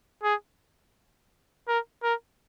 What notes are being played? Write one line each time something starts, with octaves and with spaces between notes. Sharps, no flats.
G#4
A#4
A#4